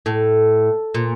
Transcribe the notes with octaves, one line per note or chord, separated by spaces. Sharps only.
A2
A#2